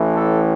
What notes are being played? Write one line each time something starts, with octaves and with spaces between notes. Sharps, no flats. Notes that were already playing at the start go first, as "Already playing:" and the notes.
Already playing: A1 A2 E3
A4